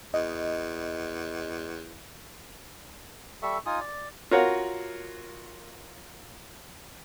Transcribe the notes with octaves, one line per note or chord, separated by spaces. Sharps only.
E2 D#5
G3 A4 E5 C#6
D#4 F4 G#5 D#6
D5
F4 F#4 A#4 C#5 F5 F#5